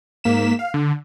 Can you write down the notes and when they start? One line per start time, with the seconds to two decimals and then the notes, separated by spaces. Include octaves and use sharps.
0.24 G#2 A#3 B6 E7
0.59 F5
0.74 D3